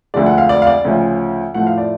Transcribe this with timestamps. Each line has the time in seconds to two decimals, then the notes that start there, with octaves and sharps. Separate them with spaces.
0.14 D2 D3 F3 G#3 D5
0.26 F#5
0.38 F5
0.49 D5
0.62 F5
0.67 D5
0.85 D2 C#3 F3
1.54 A2 F3 A3 F#5
1.67 F5
1.78 D5